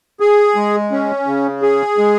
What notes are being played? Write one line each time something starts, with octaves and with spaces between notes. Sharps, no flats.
G#4
G#3
C#4
C#3
G#4
G#3